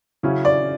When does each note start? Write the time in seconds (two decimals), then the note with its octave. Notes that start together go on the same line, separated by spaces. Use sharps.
0.23 C#3 F#3 C#4 E4
0.45 D5